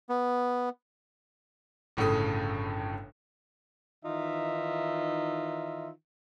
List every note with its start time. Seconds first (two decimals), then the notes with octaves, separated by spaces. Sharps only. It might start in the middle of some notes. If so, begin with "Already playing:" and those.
0.09 B3
1.97 G1 A2 C#3 A4 D#6
4.04 D#3 E3 D#4 F4 E5